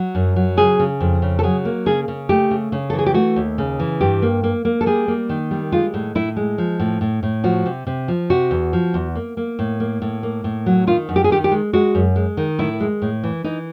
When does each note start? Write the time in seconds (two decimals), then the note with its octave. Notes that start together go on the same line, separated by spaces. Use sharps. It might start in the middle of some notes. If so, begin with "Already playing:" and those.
Already playing: F#3
0.15 F#2
0.36 F#3
0.57 C#3 G#4
0.79 C#3
1.00 F2
1.22 C#3
1.39 A4
1.43 F#3 G#4
1.65 A#3
1.86 C#3 G#4
2.08 C#3
2.29 A3 G4
2.51 C#3
2.72 C#3
2.90 A4
2.93 E3
2.98 G#4
3.06 G4
3.14 A3 F#4
3.36 D#2
3.58 C#3
3.80 E3
4.01 G2 G4
4.22 A#3
4.43 A#3
4.65 A#3
4.81 A4
4.86 G3 G#4
5.08 A#3
5.29 D#3
5.51 G3
5.72 G#3 F4
5.94 A2
6.15 A2 E4
6.36 G#3
6.58 F3
6.79 A2
7.01 A2
7.23 A2
7.44 F3 F#4
7.66 C3
7.87 C3
8.08 F3
8.30 C3 F#4
8.51 E2
8.73 F3
8.94 E2
9.15 A#3
9.37 A#3
9.59 A2
9.80 A#3
10.02 A2
10.23 A#3
10.44 A2
10.66 F#3
10.87 D#3 F4
11.09 F#2
11.16 G4
11.24 G#4
11.30 D#3 G4
11.44 G4
11.52 G#3
11.73 G#3 F#4
11.95 F#2
12.16 G#3
12.37 D#3
12.59 A2 E4
12.80 G#3
13.02 A2
13.23 E3
13.44 E3 D#4